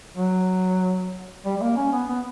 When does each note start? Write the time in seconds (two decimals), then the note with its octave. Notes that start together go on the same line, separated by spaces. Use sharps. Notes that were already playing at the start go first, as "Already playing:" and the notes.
0.16 F#3
1.45 G3
1.57 G3
1.61 A#3
1.76 C#4
1.93 B3
2.09 B3